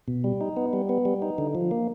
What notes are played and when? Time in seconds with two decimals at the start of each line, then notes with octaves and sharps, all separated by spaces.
0.08 B2
0.24 G3
0.41 D#4
0.57 B3
0.73 G3
0.89 B3
1.05 G3
1.22 D#4
1.38 D3
1.55 F3
1.71 A#3